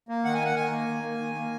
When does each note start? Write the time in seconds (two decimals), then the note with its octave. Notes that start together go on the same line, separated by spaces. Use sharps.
0.09 A#3
0.25 D#3 F#5
0.34 G#5
0.41 A#3 F#5
0.56 D#3 G#5
0.71 A#3
0.88 D#3
1.03 A#3
1.18 D#3
1.35 A#3